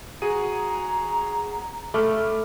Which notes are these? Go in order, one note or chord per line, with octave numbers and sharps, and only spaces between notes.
F#4 G#4 A#5 D#7
A3 B5 D6 F6